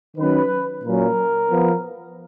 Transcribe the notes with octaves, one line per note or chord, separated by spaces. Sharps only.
D#3 F#3 C#4 B4
A#2 F#3 C#4 A#4
F3 B3